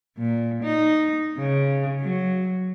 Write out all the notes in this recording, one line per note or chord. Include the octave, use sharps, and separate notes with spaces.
A#2
D#4
C#3
F#3